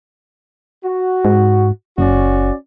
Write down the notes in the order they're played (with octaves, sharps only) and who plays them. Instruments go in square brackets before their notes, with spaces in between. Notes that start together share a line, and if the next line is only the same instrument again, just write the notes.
[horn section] F#4
[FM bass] G#2
[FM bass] F#1 [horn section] C#4 F#4 D5